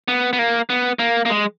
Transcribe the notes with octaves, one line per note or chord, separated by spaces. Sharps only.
B3
B3
A#3
B3
A#3
A#3
G#3